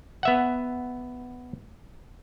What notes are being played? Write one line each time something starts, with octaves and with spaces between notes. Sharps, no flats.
B3 E5 F#5